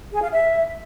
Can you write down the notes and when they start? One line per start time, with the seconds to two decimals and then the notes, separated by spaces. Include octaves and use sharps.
0.12 G#4
0.22 F5
0.32 E5